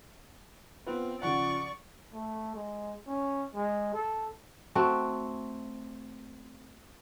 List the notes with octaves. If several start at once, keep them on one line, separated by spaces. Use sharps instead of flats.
B3 C4 F4 B4
C#3 F3 D5 F#5 C#6
A3
G#3
C#4
G#3
A4
A3 C4 F#4